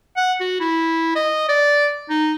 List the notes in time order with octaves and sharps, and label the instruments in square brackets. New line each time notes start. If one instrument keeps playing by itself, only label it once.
[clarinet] F#5
F#4
E4
D#5
D5
D#4